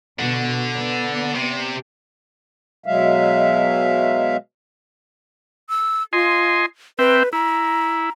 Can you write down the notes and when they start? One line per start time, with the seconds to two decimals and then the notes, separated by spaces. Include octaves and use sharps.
0.19 B2 D3
0.75 B3 D5
1.35 C3
2.86 B2 F#3 G#3 E5 F5
5.69 E6
6.13 F4 D#5 G#5 C6
6.99 C4 B4 E5 G5
7.33 E4 A#5